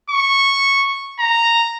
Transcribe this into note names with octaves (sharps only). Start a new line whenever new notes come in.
C#6
A#5